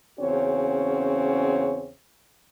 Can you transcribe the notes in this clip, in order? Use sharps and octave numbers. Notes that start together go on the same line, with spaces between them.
E2 C#3 C4 C#4 F#4 C#5